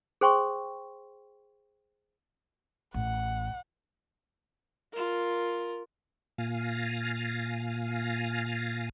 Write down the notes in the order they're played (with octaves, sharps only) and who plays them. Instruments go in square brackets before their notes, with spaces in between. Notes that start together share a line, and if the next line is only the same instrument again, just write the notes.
[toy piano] G#4 C5 G5 C6 C#6
[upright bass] A1 [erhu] F#5
[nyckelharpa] F4 A#4
[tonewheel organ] A#2 F5 G#5 F6 A6 A#6